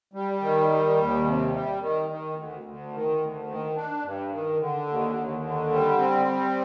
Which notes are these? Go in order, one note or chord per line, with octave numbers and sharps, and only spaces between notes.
G3
D#3
G3
D#2
C3
G3
D#3
D#3
D2
D2
D#3
D2
D#3
D4
G2
D#3
D3
D#2
D#2
D3
G3
C4
G3